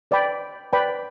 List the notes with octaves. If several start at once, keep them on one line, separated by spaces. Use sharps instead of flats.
B4 D5 G5 B5
B4 D5 G5 B5